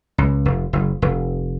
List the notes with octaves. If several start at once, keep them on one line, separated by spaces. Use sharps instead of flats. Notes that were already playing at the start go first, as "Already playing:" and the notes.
C#2
F1
F#1
F1